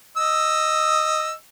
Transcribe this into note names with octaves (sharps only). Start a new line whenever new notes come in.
D#5 E6